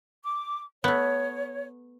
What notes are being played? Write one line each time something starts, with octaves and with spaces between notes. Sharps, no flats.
D6
A3 B3 C#5